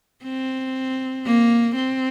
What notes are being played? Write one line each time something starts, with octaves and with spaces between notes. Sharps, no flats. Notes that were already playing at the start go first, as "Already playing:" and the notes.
C4
A#3
C4